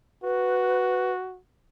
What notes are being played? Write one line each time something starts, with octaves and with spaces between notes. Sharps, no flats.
F#4 B4